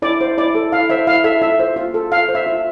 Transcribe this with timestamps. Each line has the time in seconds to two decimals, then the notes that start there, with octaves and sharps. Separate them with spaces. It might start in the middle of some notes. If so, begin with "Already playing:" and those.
0.02 E4 D5
0.21 C5
0.38 E4 D5
0.55 A4
0.72 E4 F5
0.90 C5 E5
1.07 E4 F5
1.24 A4 E5
1.42 F4 E5
1.59 C5
1.76 F4
1.94 A4
2.11 F4 F5
2.29 C5
2.35 E5
2.46 F4